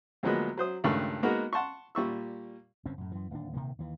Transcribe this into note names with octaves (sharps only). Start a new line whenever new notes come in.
D2 F3 F#3 G#3 A#3 B3
F#3 C5 D#6
C#2 G2 D#3 A3 C#6
G#3 A#3 B3 D#4 F#4 A#4
F#5 A5 C6 C#6
A#2 G3 C#6 E6
F#1 G2 C4 C#4
F#2 A2
F#2 E3
D1 D#2 E3 D4
D#1 C3 D#3 A#3
D#2 E3